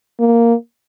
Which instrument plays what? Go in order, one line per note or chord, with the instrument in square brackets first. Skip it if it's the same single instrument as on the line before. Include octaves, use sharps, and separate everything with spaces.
[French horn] A#3